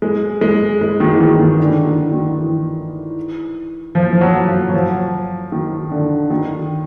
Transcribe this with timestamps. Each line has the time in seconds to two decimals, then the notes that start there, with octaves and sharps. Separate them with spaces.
0.02 G#3
0.41 G#3
0.81 G#3
1.00 D#3
1.13 E3
1.20 D#3
1.39 D#3
1.60 D3
1.85 D#3
2.12 D#3
2.38 E3
3.95 F3
4.13 F3
4.21 F#3
4.48 F3
4.70 F#3
4.74 F3
5.52 D#3
5.92 D3
6.30 D#3